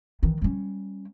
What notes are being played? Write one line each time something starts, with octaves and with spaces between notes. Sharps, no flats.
D#3 E3
G3 C#4